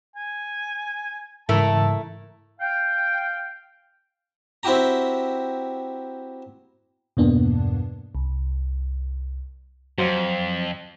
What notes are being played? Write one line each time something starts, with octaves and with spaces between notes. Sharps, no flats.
G#5
G#2 C#3 E3 A3 E4 A#4 A5
F5 G5
C4 E4 F#4 G4 A#5
E2 G2 B2 A#3 B3 D4
C2
F2 F#3 C5 F5